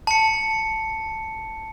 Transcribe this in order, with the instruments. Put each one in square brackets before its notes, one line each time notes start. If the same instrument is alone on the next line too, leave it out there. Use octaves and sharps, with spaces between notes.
[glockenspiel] A5 C#7